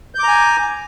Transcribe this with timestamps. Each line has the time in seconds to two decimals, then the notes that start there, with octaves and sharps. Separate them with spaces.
0.15 G6
0.19 D6
0.23 A#5
0.28 G#5